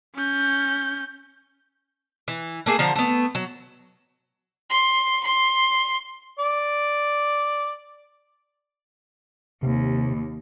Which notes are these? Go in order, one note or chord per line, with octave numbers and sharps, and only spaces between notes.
C#4 G6
E3
A3 A#3 G#4
D3 F3 A#5
A3 B3
F#3
C6
C6
D5
D#2 C3